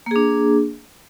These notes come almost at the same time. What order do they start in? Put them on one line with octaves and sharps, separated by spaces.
A#3 G#4 D4